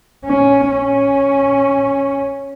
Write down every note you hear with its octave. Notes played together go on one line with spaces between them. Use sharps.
C#4
C#4